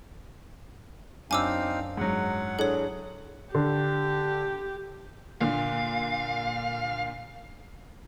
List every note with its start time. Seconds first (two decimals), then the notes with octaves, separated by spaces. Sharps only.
1.31 F#2 C4 D4 D#4 F5 G#5 D6 E6
1.97 G#2 F#3 F#5
2.59 D4 E4 G#4 A4 C#5
3.55 D3 G4
5.41 A#2 D3 F5